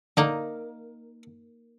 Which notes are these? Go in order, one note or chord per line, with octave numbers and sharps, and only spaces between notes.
D3 A#3 D#4